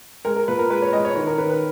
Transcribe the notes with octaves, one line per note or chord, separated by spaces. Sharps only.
G#3 A#4
A#4
A#2 B4
A#4
G#3 B4
C#5
G#3 D#5
C#5
D#3 C#5
A#4
D#3 B4
B4